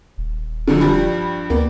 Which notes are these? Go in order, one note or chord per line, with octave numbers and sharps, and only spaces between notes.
D#1
D3 F3 F#3
G2 F3 G3
D2 A#3 B3